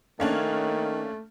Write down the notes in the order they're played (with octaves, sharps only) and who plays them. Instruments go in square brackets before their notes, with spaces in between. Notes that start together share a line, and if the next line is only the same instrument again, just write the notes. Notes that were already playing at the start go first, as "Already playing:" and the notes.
[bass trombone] D#3 [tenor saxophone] A3 [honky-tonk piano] A#3 C#4 D4